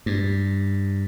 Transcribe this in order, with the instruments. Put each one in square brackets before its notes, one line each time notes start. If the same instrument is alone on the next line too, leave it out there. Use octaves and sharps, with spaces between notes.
[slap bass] G2